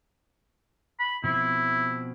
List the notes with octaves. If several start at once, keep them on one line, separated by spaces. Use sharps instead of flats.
B5
B2 F3 C4 E4